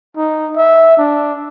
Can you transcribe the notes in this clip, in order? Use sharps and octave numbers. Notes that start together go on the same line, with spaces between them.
D#4
E5
D4